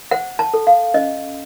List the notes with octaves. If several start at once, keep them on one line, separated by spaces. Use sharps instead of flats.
C5 F#5
A5
A4
F5
C#4 D#5